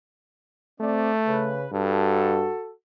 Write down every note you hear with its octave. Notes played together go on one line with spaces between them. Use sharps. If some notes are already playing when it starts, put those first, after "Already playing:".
A3 C4 D5
C#3 B4
G2 F#4 A4